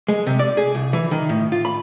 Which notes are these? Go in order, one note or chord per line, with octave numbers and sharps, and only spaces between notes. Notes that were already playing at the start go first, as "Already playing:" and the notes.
G#3
C3
D5
G#4
C2
E3
D#3
A2
F4
B5